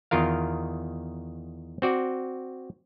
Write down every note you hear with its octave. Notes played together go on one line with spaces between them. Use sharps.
E2 D#3 F4 A#4 F5
C4 F#4 D5